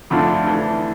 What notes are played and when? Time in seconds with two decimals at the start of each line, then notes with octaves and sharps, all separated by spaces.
0.10 F2 D3 A3 D4 F4
0.48 E3 A3 D4